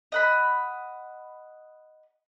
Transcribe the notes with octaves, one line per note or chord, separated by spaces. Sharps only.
D#5 F#5 B5